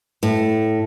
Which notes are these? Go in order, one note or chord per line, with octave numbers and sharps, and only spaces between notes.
A2